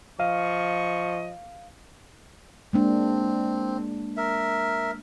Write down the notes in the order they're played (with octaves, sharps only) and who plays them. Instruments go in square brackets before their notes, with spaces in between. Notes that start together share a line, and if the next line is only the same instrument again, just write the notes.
[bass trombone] F3 [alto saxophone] D#5 [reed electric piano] F5 [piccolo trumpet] C#6
[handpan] G#3 A#3 D4 [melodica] C4
[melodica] A#4 E5